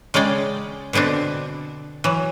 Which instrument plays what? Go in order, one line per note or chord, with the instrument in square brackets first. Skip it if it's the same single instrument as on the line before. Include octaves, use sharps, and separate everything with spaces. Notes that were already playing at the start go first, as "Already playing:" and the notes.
[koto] C#3 G#3 G#4 D5 G5
B2 D3 B3 C4 D4
E3 F#3